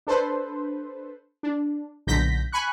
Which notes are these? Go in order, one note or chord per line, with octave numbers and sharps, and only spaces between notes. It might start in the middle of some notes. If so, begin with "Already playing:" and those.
D4 A4 B4 C5
D4
B1 A#2 D3 G6 A#6 B6
G#5 B5 C#6 F#6